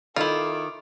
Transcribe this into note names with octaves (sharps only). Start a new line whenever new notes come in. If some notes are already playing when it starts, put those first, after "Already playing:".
D#3 E4 F4 A4 D6